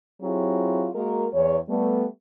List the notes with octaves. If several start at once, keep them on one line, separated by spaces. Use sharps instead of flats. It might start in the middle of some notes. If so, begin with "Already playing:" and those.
F#3 C4 E4 F4 G4 G#4
G#3 A#3 F#4 A#4
E2 C#5
G3 A3 B3